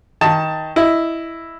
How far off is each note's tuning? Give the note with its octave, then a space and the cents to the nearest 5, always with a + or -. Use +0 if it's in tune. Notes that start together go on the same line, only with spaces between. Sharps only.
D#3 +20 A5 +10
E4 +0 D#5 +0